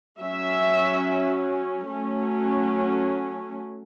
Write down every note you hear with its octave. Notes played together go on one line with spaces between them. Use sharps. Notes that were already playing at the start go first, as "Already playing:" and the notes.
F#3 C#4 E5
F#3 A3 C#4